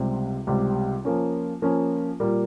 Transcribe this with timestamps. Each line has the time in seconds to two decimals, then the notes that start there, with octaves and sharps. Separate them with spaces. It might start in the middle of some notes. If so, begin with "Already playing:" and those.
Already playing: C#2 C3 G3
0.47 C#2 C3 G3
1.05 F3 A#3 C#4
1.62 F3 A#3 C#4
2.20 A#2 G3 A#3